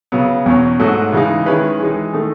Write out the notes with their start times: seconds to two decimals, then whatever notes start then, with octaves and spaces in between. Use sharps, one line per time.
0.12 C#3 F#3 B3
0.46 E2 B2 F#3 C#4
0.79 G#2 F#3 A3 D#4 F#4
1.12 C#3 E3 G#3 D#4
1.46 D#3 G#3 C#4 E4 B4
1.80 E3 G#3 D#4
2.13 D#3 A3 D#4 A4